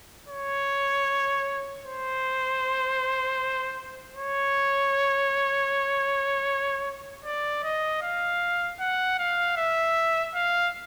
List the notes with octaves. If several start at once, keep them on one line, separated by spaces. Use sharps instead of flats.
C#5
C5
C#5
D5
D#5
F5
F#5
F5
E5
F5